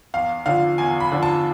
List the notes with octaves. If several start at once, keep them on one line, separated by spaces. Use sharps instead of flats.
E2 F5
D3 F3 F5
E2 G#5
B5
D3 F3
A5